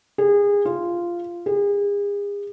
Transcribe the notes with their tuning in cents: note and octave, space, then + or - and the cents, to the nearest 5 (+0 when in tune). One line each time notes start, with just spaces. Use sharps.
G#4 -30
F4 -10
G#4 -40